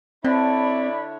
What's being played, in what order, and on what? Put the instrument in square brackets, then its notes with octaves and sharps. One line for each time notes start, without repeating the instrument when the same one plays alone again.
[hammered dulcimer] D3 [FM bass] C4 [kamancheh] E4 C#5 [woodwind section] D5 B5